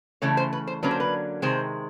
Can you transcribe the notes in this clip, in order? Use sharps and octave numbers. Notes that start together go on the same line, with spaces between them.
C#3 E3 A3 C#4 C#5
C5
B4
C5
D3 F#3 A#3 C#4 B4
C5
B4
C3 D#3 G#3 C5